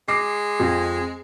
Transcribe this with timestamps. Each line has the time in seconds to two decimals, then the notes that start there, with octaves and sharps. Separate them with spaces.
0.08 G#3 D6 C7
0.60 F2